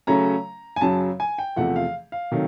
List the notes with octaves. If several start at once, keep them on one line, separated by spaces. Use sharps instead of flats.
C#3 F#3 A3 C#4 A#5
G#5
F#2 C#3 F#3 A5
G#5
G5
E2 C3 F3 A3 F#5
F5
F5
C3 D#3 F#3 A3